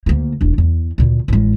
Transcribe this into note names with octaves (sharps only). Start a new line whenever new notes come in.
D2 A#3
E1 D4
E2
D2 A#2
A1 G#3